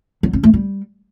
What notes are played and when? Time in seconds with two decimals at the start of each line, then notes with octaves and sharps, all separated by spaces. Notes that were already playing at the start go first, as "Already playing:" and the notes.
0.23 F#3
0.33 C#4
0.43 A3
0.54 G3